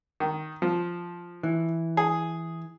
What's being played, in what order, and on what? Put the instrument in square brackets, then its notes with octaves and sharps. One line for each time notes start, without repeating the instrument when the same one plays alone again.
[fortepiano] D#3
F3
[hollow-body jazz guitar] E3
[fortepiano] G#4